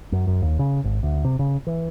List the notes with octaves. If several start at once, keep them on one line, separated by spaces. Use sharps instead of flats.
F#2
F#2
D#2
C#3
G#1
D2
C3
C#3
E3